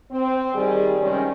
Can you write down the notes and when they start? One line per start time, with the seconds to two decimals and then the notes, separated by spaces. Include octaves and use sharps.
0.11 C4
0.54 D#3 G3 G#4
1.00 C3 D#3 G3 G#3 C#4